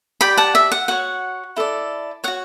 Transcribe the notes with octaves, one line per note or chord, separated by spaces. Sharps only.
G4 D5 G5 B5
F#5 A5
E5
F#5
F#4 C#5 F#5
E4 A4 D5
F#4 C#5 F#5